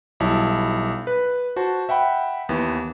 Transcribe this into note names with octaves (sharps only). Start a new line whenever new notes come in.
B1 G3 E4 A5
B4
F#4 C5 A5
E5 F#5 G5 B5
D#2 E3 B3